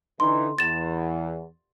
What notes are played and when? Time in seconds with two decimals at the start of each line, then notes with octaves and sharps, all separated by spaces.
0.20 D3 E3 D#4 C6
0.59 E2 A6 E7